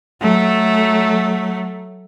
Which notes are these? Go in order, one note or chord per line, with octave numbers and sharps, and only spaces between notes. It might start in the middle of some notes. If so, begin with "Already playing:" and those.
F#3 A3